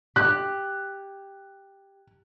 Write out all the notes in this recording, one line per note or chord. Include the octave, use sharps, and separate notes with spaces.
G4 F#6